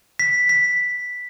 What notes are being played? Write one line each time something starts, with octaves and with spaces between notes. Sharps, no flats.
B6
B6